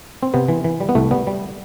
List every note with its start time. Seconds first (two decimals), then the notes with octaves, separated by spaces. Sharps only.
0.23 C4
0.34 C3 B3
0.48 E3
0.64 E3
0.80 G3
0.89 B3
0.95 C2 A3
1.11 G3 B3
1.27 G3